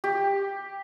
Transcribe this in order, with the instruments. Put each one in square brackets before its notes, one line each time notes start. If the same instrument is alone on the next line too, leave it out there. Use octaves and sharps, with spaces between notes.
[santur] G4